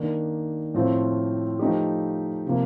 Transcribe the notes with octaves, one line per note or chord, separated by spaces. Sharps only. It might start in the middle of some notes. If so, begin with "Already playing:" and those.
Already playing: D#3 A#3 D4
A2 F3 C4 F4
F3 A3 D#4 G4
C3 F3 A#3